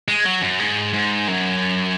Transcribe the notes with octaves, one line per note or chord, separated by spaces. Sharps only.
G#3
F#3
F#2
G#2
G#2
F#2